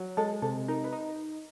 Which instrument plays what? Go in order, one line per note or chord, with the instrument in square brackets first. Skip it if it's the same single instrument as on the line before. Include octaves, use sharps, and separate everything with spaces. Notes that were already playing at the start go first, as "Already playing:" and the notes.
Already playing: [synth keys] F#3
[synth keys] G#3 [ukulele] A4
[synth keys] C3 [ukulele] A4
[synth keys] D#4 [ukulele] A#4
[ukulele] B4
[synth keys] D#4